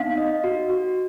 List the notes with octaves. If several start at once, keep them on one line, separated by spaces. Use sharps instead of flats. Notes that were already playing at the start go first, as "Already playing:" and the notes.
Already playing: D#4 F5
D#5
F#4
F#4